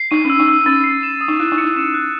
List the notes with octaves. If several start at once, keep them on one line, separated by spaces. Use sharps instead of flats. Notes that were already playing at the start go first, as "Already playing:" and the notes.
Already playing: C7
D#4 D#7
C#4 E6
D#4
E6
C#4 A6
C7
E7
D#6
D#4
E4 F#6
D#4
C#7
D#4
C#4 E7
F#6